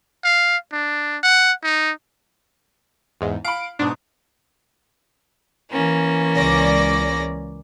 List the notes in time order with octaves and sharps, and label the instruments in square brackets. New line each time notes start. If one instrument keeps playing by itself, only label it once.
[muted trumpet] F5
D4
F#5
D#4
[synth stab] E2 G#2
[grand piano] F5 B5 [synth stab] D7
[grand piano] G#2 B2 [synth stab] D4
[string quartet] E3 A#3 C#4
[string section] C#2 D5 A#6